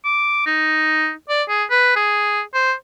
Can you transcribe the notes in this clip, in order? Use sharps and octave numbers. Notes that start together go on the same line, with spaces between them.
D6
D#4
D5
G#4
B4
G#4
C5